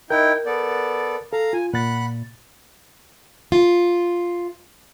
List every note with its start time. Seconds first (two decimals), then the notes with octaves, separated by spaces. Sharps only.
0.10 D#4 E4 A#4 G5 G6
0.46 B3 A4 D5
1.33 A4 F5 A#5
1.53 F4 G#5
1.74 A#2 F#5 B5 F#6 A6
3.52 F4